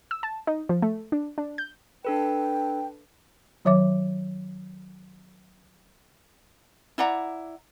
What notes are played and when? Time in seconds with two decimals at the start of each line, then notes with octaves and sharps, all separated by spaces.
0.11 E6
0.23 A5
0.47 D#4
0.69 F3
0.82 A3
1.12 D4
1.38 D4
1.58 G6
2.05 D4 A4 B4 G5
3.65 D#3 F#3 C#5 E5 D6
6.98 E4 D5 F#5 A#5